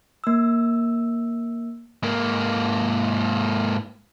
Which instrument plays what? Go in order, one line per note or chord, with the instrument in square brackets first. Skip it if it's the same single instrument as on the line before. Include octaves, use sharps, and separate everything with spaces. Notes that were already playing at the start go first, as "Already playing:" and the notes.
[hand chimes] A#3 E6
[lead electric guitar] G#2 A#3